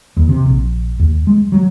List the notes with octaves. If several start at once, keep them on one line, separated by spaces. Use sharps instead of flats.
D#2
C3
A#1
D#2
G#3
F#3